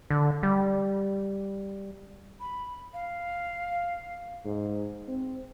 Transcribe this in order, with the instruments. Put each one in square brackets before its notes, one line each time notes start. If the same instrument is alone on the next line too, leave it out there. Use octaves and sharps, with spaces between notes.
[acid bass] D3
G3
[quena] B5
F5
[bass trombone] G#2
C4